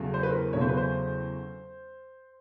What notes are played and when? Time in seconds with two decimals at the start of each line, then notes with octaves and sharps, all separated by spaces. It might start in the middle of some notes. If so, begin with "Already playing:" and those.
Already playing: E2 C#3 F#3 A3
0.14 C5
0.23 B4
0.31 A#4
0.53 E2 C#3 F#3 A3 C#5
0.61 C5
0.69 B4
0.77 C5